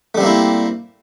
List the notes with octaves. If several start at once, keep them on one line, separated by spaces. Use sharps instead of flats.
G3 A3 A#3 C4 E4